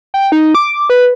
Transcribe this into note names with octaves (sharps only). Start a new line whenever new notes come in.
G5
D#4
D6
B4